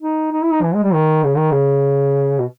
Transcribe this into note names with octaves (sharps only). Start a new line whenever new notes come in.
D#4
D#4
E4
D#4
E3
G#3
G3
D#3
C#3
D#3
C#3
B2